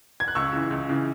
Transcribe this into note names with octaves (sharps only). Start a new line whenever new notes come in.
G#6
F#6
C#2 C#6 E6
C#3 E3
C#2
C#3 E3